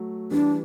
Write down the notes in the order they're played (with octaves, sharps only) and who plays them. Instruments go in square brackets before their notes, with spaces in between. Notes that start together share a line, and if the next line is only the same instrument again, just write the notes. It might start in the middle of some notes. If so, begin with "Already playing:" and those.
Already playing: [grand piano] F#3 A3
[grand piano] E3 G3 [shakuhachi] D4